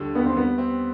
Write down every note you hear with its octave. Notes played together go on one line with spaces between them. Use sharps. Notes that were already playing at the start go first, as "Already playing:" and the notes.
Already playing: D#2 D3 G3
D#2 B3
C4
G3 B3
C4